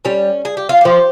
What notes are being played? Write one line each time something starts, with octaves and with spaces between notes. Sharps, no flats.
G3 C#4
G#4
G4
F4
F3 G4